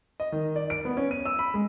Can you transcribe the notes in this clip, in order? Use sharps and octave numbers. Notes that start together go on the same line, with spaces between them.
D#5
D#3
D5
D7
B3
C#4
D#7
E6
B5
G#3